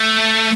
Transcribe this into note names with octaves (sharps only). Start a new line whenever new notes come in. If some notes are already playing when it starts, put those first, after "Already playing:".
Already playing: A3